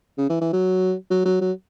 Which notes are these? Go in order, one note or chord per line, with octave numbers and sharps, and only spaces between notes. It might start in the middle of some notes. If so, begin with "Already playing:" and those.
C#3
E3
E3
F#3
F#3
F#3
F#3